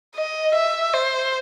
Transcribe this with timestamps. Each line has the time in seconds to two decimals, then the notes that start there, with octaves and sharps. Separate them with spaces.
0.16 D#5
0.54 E5
0.94 C5